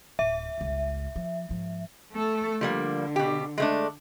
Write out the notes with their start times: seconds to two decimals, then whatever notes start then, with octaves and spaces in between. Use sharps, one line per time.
0.19 D1 E5
0.58 G1 C#2
1.16 F3
1.49 G#2 F3
2.12 A3 A4
2.61 D3 F3 G3 A#3
3.16 B2 G4
3.58 G#3 A3 D4